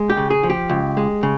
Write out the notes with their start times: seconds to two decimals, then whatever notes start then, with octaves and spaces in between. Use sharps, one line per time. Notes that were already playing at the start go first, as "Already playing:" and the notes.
Already playing: G#3
0.10 G4
0.17 C#3
0.30 G#4
0.43 F3
0.50 G4
0.70 C#2
0.97 G#3
1.23 C#3